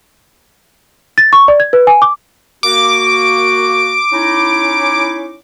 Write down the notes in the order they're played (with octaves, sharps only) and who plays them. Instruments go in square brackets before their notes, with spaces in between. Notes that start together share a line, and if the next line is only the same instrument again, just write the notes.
[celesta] A6
C#6
D5
G#6
B4
G#5
D6
[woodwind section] A#3 F#4 [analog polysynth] D6
[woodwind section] C#4 D#4 E4